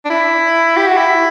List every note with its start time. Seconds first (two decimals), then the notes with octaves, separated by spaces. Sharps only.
0.05 D4
0.10 E4
0.77 G4
0.87 F#4
0.97 E4